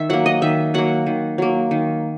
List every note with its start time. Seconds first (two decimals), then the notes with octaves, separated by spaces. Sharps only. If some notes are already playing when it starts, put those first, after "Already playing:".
Already playing: D#3 E5
0.10 F#3 A#3 F#5
0.26 D#5
0.42 D#3 E5
0.74 F#3 A#3 F#5
1.06 D#3
1.38 F#3 A#3
1.71 D#3